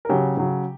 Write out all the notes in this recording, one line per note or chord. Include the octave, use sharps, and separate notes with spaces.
A#4
C#3 F#3 G4
C#3 F#3